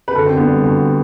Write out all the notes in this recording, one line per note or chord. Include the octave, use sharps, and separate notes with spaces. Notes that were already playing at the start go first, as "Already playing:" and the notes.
B4
D2 A4
C4
D3 B3
G3
D2